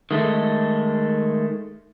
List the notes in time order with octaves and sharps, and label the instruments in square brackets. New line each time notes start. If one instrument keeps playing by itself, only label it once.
[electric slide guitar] D#3 G#3 A3